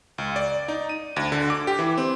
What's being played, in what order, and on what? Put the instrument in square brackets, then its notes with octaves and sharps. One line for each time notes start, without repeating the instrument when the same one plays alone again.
[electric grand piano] C#2
D5
D#4
D#7
D2
D3
D6
G4
E3
C4